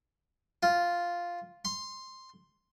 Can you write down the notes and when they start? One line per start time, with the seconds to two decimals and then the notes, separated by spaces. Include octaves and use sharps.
0.63 F4
1.65 C6